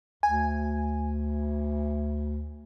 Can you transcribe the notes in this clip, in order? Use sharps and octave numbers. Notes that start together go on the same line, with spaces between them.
D2 G#5